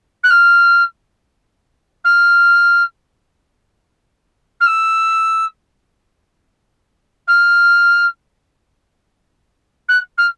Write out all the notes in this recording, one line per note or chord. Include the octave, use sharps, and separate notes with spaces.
F#6
F6
F6
F6
E6
F6
F#6
F6